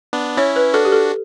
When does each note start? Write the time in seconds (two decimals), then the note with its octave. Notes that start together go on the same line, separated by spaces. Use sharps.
0.13 B3 D4
0.37 C#4 E4 C#5
0.56 B4
0.74 D4 F#4 A4
0.85 G4
0.92 A4